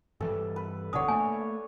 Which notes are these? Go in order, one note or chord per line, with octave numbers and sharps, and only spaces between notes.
G2 E3 G3 A4
B4
D1 B2 D3 D4 C#5 F#5 D#6
A3 A#3 G#5